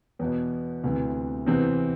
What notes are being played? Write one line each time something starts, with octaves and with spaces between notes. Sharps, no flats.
E2 B2 B3
D2 C3 E3
E2 C3 E3 C4